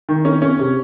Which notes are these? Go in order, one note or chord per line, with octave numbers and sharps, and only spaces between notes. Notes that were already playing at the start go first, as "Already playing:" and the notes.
D#3
C#4
C#4
C3